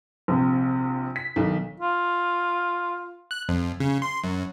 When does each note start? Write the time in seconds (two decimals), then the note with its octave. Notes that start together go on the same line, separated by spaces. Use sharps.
0.28 A#1 C3
1.16 B6
1.36 B1 D#3
1.80 F4
3.31 F#6
3.49 F2
3.80 C#3
4.02 C6
4.24 F#2